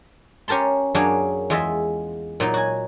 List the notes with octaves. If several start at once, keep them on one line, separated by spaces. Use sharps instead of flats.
C#4 G4 A#4 A5 C6
F#2 F#3 A#3 C#4 D4 G#4
E2 G#3 F4 D#5 E5
A#2 F#3 D#4
F#4 G#5